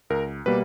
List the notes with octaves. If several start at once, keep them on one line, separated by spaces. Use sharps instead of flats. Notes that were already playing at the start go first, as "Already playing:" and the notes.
C#2 A#4
B2 G3 A#3 B4